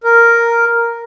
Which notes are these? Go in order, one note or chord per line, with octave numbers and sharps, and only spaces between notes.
A#4